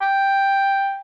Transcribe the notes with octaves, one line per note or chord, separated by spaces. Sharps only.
G5